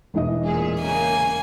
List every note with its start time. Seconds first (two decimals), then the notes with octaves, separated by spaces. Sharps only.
0.14 E1 E3 D#5
0.44 A#2 G#4
0.81 C#3 A#3 G#5